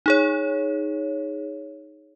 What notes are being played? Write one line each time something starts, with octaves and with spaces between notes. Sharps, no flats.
D#4 G#4 C#5